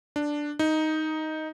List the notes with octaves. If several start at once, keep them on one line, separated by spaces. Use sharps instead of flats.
D4
D#4